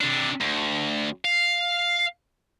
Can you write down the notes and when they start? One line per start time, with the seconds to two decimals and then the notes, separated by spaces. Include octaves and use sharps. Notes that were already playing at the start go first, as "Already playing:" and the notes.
0.01 C3 D4
0.41 D2
1.25 F5